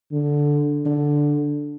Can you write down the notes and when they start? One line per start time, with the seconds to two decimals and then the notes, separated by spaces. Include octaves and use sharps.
0.12 D3
0.86 D3